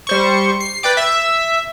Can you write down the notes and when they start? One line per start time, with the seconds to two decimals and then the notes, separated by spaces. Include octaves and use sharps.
0.07 G3 C5 C#6
0.60 C7
0.83 B4 D5 G5 D6
0.97 E5